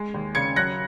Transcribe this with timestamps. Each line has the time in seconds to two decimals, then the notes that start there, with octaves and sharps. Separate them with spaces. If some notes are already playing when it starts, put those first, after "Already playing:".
Already playing: G#3
0.14 D#2
0.35 C#3 G#6 C#7
0.56 F#3 F#6 A#6